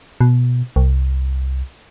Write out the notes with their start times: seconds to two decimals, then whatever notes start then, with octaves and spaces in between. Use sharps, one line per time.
0.21 B2
0.76 C2